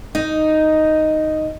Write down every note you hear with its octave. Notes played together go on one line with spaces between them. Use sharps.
D#4